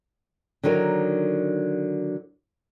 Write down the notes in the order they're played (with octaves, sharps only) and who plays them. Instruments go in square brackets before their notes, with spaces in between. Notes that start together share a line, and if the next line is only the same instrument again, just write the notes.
[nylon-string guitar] D3 D#3 F#3 D#4 A#4